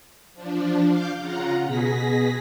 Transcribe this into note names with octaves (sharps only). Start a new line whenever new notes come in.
F3 D4
F5 D6 G6
C#3 F4 F#5 A#5
B2 G#4 A#6 B6